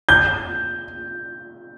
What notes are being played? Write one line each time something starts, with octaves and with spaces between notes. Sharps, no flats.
G6